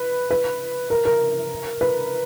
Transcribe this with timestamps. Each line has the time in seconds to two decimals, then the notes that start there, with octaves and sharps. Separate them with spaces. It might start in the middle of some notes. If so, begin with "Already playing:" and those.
Already playing: B4
0.31 B4
0.90 A#4
1.05 A#4
1.81 B4